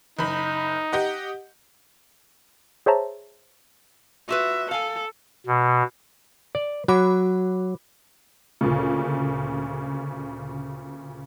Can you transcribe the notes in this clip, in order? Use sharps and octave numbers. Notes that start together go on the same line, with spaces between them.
F#1 D#4 B5
G4 D#5 F#5
G#4 C5 C#5 E5 A5 A#5
F4 F#4 B4 E5
A4 F5 G#5
B2
D5
F#3 F#4 B5 D6
D2 A#2 C#3